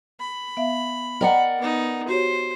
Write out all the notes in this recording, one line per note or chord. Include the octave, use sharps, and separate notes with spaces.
B5
B3 E5 F5
A#4 D5 D#5 F#5 G5 A#5
B3 D#4
F#4 G4 C5 C#5